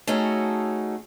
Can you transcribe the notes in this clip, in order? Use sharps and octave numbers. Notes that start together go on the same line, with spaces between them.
A3 C#4 D#4 F#4 G#4 A4